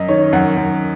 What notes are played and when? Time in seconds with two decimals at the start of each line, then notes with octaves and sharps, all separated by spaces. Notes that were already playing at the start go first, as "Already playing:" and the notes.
Already playing: F#2 D#5
0.09 D#3 C#5
0.33 F#2 F#5
0.57 F#2